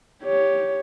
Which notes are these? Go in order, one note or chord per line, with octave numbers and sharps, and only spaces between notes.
G4 C#5